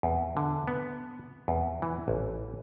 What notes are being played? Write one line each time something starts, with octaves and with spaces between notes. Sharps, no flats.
E2
D3
B3
E2
E3
A1